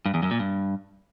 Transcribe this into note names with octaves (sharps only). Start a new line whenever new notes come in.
G2
E2
F#2
A#2
G2